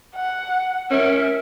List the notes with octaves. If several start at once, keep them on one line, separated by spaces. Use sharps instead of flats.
F#5
C#4 A#4 E5